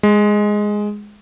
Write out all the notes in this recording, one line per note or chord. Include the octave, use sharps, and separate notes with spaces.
G#3